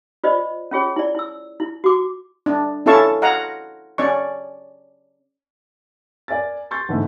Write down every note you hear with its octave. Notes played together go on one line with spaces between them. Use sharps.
F4 C5 D5 D#5
C#4 F4 G#4 C#5
E4 D5
E4 E6
E4
F#4 D6
D4
C#4 E4 A4 F5 A5 C#6
F5 F#5 A#5
C#4 D5 C#6
A#4 D5 G#5 A6
C6 C#6 G6 A6
G#2 D3 E3 A3 B3